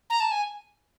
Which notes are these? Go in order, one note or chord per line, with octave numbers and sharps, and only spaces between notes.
A#5
A5
G#5